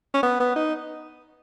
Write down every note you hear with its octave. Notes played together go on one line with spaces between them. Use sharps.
C#4
B3
B3
D#4